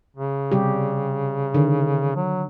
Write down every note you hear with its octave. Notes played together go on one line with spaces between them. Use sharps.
C#3
C3 G3 G4
D3 D#3
F#3